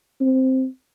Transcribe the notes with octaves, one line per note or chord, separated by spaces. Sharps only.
C4